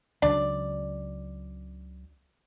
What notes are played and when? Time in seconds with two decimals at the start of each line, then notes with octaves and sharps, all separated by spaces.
0.22 C#2 C#3 F#3 D4 D5